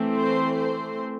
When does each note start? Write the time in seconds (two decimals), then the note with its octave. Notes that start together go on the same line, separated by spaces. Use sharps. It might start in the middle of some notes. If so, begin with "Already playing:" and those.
Already playing: E3 A3 C4
0.16 C5
0.58 C5